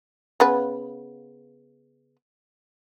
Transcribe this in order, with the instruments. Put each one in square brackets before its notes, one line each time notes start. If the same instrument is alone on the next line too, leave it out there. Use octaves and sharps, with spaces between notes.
[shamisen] C#3 B3 B4